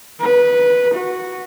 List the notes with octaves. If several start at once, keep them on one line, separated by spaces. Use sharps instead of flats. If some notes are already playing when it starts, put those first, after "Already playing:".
B4
F#4